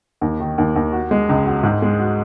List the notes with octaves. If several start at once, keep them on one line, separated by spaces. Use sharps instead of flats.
D#2
D#3
D#2
D#2
F#4
G#3
C#2
F#4
G#2
G#3
F#4